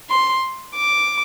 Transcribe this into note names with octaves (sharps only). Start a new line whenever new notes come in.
C6
D6